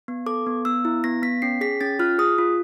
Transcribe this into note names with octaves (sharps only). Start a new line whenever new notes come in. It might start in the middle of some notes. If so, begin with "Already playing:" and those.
B3
A4 D6
B3
B3 E6
E4
B3 A#6
B3 B6
C#4 C7
G#4 B6
C#4 A6
F4 F6
G#4 D#6
F4